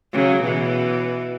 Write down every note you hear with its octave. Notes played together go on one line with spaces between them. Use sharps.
C#3 F#3
B2 E3